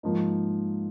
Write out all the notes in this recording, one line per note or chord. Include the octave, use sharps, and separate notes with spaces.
G#2 F3 A#3 D#4